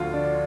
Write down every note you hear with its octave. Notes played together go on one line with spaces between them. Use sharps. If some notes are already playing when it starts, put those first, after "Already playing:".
Already playing: D2 D3 F3 F4 F#4
D4